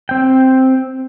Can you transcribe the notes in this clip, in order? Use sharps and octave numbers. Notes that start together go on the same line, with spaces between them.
C4 G5